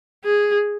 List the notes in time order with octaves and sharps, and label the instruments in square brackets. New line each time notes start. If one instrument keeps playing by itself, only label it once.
[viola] G#4